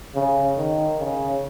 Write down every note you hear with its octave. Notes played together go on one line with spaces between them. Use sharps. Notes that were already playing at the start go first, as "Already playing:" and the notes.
C#3
D#3
C#3